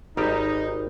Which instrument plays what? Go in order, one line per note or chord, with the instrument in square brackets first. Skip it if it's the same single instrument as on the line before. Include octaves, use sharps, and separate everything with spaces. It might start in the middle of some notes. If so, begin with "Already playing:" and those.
[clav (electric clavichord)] G#1 G3 G4 [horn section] D#4